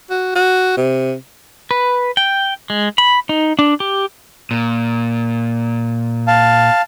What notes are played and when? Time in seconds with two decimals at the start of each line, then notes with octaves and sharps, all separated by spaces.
0.10 F#4
0.36 F#4
0.77 C3
1.71 B4
2.17 G5
2.70 G#3
2.98 B5
3.29 D#4
3.59 D4
3.80 G4
4.51 A#2
6.28 F5 A5